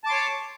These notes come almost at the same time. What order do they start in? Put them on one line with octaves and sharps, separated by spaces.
A5 D6 C6 C#5